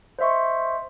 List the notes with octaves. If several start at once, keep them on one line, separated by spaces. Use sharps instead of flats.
C5 D#5 E5 C6 C#6